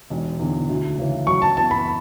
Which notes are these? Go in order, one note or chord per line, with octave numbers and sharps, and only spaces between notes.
E1
E2 D3
D2
C#3 E3
F#2 C#6
A5
E3 B3 A5
B5